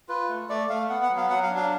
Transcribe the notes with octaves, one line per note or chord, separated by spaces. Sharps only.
F4 B4
A3
A3 D5
A3 F5
B3 F#5
F#5
F#3
F5
F#3 F#5
F5
D4
F5